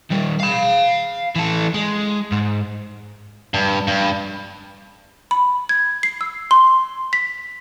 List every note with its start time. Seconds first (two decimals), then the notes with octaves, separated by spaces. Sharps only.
0.10 D#2 G3
0.40 F5 B5
1.36 E3 A4
1.74 G#3
2.32 G#2
3.54 G2
3.87 G2
5.31 B5
5.69 G#6
6.03 C7
6.21 E6
6.51 C6
7.13 B6